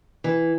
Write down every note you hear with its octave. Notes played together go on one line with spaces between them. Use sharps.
E3